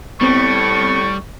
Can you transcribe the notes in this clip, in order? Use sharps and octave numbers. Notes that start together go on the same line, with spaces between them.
A2 G3 B3 C4 C#6